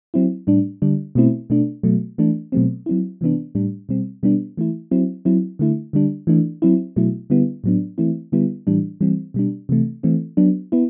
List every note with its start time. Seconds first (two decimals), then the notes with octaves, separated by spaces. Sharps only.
0.14 F#3 C4 E4
0.47 A2 G3 D4
0.82 D3 G3 D4
1.15 B2 A3 C4 E4
1.50 B2 A3 D4
1.83 B2 F#3 A3
2.18 E3 A3 D4
2.52 B2 F#3 A3 C4
2.86 F#3 C4 E4
3.21 C3 E3 B3 D4
3.55 A2 G3 D4
3.89 B2 G3 C4
4.23 B2 G3 B3 D4
4.57 E3 A3 E4
4.91 F#3 C4 E4
5.25 F#3 C4 E4
5.59 D3 A3 E4
5.93 D3 G3 D4
6.27 E3 A3 D4
6.62 F#3 C4 E4
6.96 B2 F#3 A3 E4
7.30 D3 G3 B3 E4
7.64 A2 F#3 B3 D4
7.98 E3 A3 C4 E4
8.32 D3 G3 B3 E4
8.67 A2 E3 G3 D4
9.01 E3 G3 C4
9.34 B2 G3 D4
9.69 C3 E3 A3
10.03 E3 A3 C4
10.37 F#3 B3 D4
10.72 B3 E4